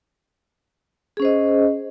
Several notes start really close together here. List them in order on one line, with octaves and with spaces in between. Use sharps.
G#4 C#4 C5 D#5